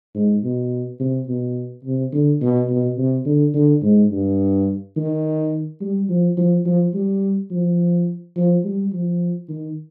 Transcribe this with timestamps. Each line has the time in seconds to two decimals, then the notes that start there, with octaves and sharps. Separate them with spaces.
0.15 G#2
0.43 B2
1.00 C3
1.28 B2
1.85 C3
2.12 D3
2.41 B2
2.69 B2
2.98 C3
3.26 D3
3.54 D3
3.82 G#2
4.11 G2
4.97 D#3
5.81 G3
6.09 F3
6.37 F3
6.66 F3
6.94 G3
7.51 F3
8.37 F3
8.64 G3
8.92 F3
9.49 D#3